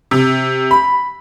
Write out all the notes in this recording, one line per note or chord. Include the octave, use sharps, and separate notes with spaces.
C3
B5